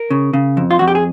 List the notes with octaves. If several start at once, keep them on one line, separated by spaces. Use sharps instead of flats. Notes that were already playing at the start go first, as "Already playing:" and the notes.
Already playing: A#4
C#3
C#3
F2
F4
F2 F#4
G4
G#4